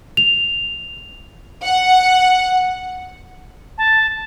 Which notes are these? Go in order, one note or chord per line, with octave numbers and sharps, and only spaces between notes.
F7
F#5
A5